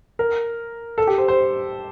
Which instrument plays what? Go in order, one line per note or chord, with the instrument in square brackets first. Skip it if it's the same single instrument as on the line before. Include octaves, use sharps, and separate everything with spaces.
[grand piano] A#4
A4
G4
C5
C5